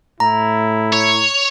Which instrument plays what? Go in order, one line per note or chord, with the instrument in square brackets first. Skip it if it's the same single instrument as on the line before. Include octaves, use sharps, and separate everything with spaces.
[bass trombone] A2 [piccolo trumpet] E4 [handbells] A#5
[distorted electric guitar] C#5